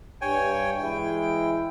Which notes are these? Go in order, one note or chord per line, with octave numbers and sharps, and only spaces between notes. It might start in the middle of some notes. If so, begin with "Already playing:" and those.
G2 C#5 G5 G#5
E3 G#3 E4 G5